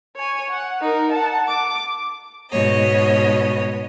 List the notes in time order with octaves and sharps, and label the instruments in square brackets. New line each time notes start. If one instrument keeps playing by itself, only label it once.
[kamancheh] C#5 G#5
F#5
D#4 A#4
F#5 A5
D6
[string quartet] G#2 B2 C#5 D#5